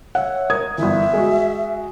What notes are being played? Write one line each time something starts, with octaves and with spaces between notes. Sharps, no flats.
C#5 E5 F#5
A#4 D#6 G#6
G1 E3 E5
G#3 F#4